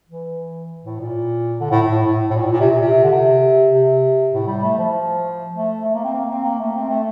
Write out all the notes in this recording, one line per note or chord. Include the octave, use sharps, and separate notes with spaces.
E3
A2
A#2
D3
A2
A2
A2
A2
A#2
A2
A#2
C3
A#2
C3
D3
C3
C3
A2
G3
A3
F3
A3
A3
A#3
C4
A#3
C4
A#3
A3
C4
A3